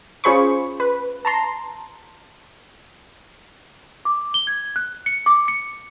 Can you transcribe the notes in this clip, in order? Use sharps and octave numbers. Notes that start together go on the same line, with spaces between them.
C#4 F4 G#4 C5 B5 C#6
B4
A5 A#5 C6
D6
G7
G#6
F#6
C#7
D6
C#7